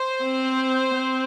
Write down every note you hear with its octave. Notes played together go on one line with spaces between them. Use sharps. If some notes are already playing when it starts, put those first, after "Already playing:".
Already playing: C5
C4
C4